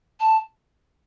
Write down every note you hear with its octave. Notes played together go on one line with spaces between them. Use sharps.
A5